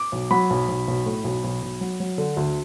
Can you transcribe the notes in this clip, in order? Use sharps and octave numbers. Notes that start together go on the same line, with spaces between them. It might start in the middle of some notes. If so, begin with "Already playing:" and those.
Already playing: D6
B1
F#3 B5
B1
B1
B1
A2
B1
B1
B1
F#3
F#3
D3
D2